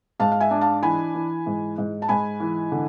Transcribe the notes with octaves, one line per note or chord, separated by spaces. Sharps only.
G#2 F5 A5
F5
E5 G#5
D4
F5 A5
E3 G#5 B5
E3
G#2
G#2
A5
G#2 G#5 B5
E3
D3